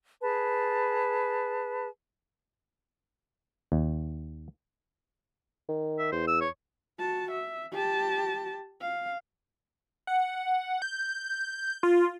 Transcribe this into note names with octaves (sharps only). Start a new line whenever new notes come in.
G#4 B4 A5
D#2
D#3
E5
E2 C5
E6
C#5
F#4 A5
E5
G4 A5
F5
F#5
G6
F4